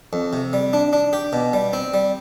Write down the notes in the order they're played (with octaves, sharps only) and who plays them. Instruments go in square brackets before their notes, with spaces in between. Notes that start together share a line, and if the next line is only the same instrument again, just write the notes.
[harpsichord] F2
C3
G3
D4
D4
G4
B2
G3
C4
G3